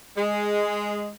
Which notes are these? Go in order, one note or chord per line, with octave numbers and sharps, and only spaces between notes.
G#3